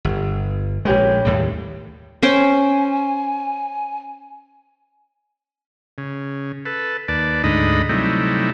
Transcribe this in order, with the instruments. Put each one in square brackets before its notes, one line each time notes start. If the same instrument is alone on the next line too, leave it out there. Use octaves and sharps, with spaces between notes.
[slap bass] G1
[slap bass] A#1 G#3 [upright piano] C#4 G4 B4
[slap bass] D#2 A2 G3
[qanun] C#4 C5 G5 [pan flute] G#5
[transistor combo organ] C#3
A4 B4
D#2 B4 D5 A5
D2 G#2 D3 D#4 D#5 B5
C3 F#3 G3 A3 D#4 E4